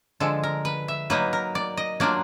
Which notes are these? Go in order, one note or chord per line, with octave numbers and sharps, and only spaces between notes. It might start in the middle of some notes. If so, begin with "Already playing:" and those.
D3 F3 G#3 A4
A#4
B4
E5
F#3 A#3 D#4 B4
A#4
D5
D#5
F#3 A#3 D4 F4 D5